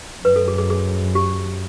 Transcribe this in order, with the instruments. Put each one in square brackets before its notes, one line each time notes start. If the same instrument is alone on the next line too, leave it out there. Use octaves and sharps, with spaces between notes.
[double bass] F#2 [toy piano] B4
[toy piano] A4
G#4
G#4
G#4
G4